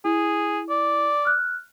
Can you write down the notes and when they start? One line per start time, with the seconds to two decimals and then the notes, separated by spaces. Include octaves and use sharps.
0.05 E4 G#4
0.69 D5
1.25 F6 F#6